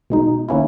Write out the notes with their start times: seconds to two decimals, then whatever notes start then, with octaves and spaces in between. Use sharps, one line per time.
0.10 B2 G#3 D#4
0.48 D#3 A#3 C#4 E4